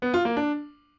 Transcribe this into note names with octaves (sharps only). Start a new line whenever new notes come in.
B3
F4
A#3
D4